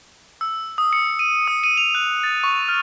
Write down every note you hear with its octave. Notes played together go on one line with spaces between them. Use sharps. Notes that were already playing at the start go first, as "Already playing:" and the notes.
E6
D#6
C#7
D#7
D#6
D#7
F7
F#6
A6
C#6
F6